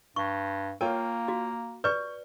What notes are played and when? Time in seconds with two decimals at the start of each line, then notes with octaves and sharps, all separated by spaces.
0.16 G2 C#6
0.81 A#3 F4 A#4 C#5 G5
1.28 F#4
1.84 B4 D5 C#6 G6